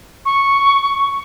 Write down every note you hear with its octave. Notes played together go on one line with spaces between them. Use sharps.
C#6